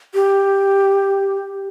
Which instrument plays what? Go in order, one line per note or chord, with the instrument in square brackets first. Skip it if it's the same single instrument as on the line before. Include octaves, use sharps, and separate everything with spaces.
[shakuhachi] G4